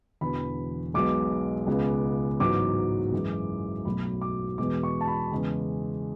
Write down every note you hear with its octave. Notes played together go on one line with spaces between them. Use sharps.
E1 E2 D3 B5
B1 B2 G#3 D6
C#2 C#3 G#3 B3
A1 G#2 F#3 B3 D6
F#2 E3 G#3
B1 B2 F#3 A3 B5
D6
E2 B2 G#3 D6
C#6
A5
B5
E2 C#3 G#3